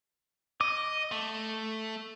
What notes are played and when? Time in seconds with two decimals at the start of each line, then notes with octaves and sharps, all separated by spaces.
0.61 D#5 D6
1.12 A3